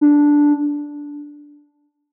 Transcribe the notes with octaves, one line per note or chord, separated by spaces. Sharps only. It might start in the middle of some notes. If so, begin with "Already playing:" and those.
D4